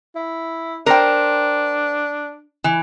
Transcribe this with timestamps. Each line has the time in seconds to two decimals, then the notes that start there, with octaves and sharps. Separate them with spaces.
0.15 E4
0.86 D4 A#4 C5 G5
2.64 E3